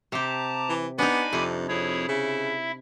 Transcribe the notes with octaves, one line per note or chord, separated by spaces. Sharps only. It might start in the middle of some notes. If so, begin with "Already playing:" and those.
C3 G4 A5 A#5 D6
E3
B3 D4 D#4 G#5 B5 D6
F2 C3
F2 E4 G#4 C#5
C#3 E4 E5